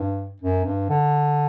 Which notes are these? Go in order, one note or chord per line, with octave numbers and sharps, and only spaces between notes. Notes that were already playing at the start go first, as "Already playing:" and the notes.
Already playing: G2
F#2
G2
D3